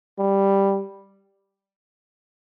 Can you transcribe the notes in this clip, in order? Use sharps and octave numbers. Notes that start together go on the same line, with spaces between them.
G3